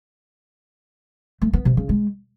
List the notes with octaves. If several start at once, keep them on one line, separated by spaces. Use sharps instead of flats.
A3
B3
C3
C#3
G#3